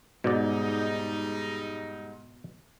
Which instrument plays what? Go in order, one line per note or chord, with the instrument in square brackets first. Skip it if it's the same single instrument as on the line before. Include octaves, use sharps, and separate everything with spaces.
[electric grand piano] G#2 [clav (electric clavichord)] B2 D5 [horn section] G3 G#3 D#4